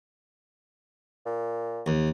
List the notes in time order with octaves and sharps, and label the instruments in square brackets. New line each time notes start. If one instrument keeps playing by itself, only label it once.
[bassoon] A#2
[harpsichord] D#2